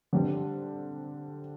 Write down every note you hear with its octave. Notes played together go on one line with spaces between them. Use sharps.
D3 G3 C4